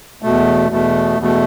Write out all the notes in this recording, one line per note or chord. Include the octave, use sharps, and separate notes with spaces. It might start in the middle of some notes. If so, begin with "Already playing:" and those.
E2 B2 A3
E2 B2 A3
E2 B2 A3